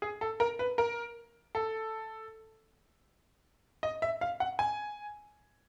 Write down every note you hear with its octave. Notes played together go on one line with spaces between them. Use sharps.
G#4
A4
A#4
B4
A#4
A4
D#5
E5
F5
F#5
G#5